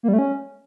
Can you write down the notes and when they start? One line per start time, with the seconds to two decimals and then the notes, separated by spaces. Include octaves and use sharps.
0.03 A#3
0.08 G3
0.13 A3
0.19 C#4